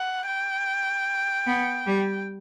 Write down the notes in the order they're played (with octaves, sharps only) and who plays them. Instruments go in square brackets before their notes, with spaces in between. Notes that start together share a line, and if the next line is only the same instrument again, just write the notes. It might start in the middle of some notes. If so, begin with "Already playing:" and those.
Already playing: [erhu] F#5
G5
[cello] B3
G3